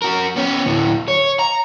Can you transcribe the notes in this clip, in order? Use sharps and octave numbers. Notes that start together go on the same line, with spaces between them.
F#4 A#4
B3 C#4
D2 A2
C#5
A#5